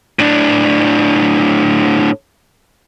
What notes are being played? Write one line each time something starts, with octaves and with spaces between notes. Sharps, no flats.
A2 D4